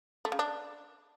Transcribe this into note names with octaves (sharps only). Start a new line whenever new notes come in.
A3
C#3
D4